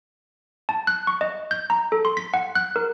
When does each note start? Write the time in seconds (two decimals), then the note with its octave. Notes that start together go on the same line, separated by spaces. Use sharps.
0.69 A5
0.87 F#6
1.07 C#6
1.21 D#5
1.51 G6
1.70 A#5
1.92 A4
2.05 C6
2.17 B6
2.34 F#5
2.55 F#6
2.76 A#4